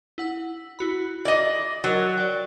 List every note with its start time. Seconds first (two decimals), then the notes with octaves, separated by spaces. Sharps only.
0.18 E4 F#5 E6
0.79 E4 F#4 B5
1.25 D5 D#5 F#7
1.84 F#3 A#4 D#5 A6
2.17 D5 G5